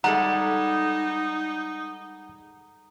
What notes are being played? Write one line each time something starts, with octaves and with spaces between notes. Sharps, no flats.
G3 G#3 D#4 A4 F#5 A#5